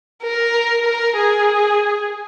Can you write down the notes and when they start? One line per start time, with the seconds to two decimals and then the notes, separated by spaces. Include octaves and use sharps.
0.23 A#4
0.86 A#4
1.17 G#4